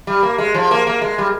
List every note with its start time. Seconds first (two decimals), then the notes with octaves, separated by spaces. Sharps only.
0.07 G3
0.23 A#3
0.38 G#3
0.54 F3
0.71 A#3
0.87 A#3
1.02 G#3
1.18 G3